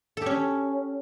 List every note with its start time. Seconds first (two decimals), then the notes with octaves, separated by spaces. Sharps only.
0.17 A4
0.22 G4
0.26 C#4